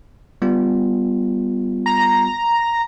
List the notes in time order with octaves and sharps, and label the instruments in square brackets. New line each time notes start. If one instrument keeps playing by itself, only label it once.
[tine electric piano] G3 B3 F4
[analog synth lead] A#5